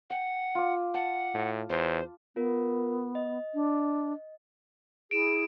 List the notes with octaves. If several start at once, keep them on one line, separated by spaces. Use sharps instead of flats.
F#5 G5
F4 D6
F#5 A5
A2
E2 C5
B3 F4 A#4
D#5
D4
E4 G#4 D7 E7